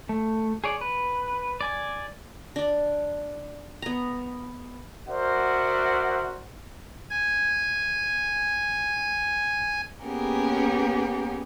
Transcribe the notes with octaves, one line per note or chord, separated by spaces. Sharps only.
A3
G#4 C#5 D5
B4
D5 G#5
D4 D5
B3 A#5
F#4 A#4 C5 D5 E5 F#5
G#5 G#6
A#3 B3 C#4 G4 G#4 A#4